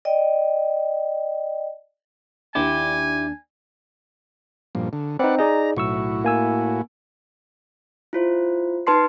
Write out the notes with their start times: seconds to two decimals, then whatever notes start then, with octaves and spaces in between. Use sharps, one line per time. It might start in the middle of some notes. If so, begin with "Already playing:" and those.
0.05 D5 D#5 G5
2.55 D#2 D4 E4 G4 G#5
4.75 G2 A#2 F3
4.93 D3
5.19 C4 D#4 B4 D5 F#5
5.38 D#4 G#4 D5 A#5
5.77 B1 A2 E4 F#4 C#6 E6
6.24 A#3 G#5 E6
8.13 E4 F4 C5
8.87 D#4 B4 A5 C6 C7